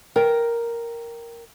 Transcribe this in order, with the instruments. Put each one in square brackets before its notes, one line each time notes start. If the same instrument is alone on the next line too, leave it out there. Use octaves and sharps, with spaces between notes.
[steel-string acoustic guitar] A#4 G5